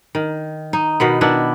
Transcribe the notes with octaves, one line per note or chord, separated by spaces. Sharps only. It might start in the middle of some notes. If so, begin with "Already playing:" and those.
D#3
D#4
B2 D#3 B3
D#3 B3 D4 E4